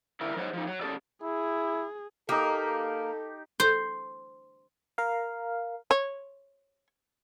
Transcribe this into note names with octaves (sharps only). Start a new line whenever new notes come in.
D3 E4 A#4
F#3 D#4 G#4 C5 F5 F#5
F3 D#4
F#3
C#4 G#4 A4 D5
E4 G#4
A#3 D#4 G4 A4
C5
A#4 F5
C#5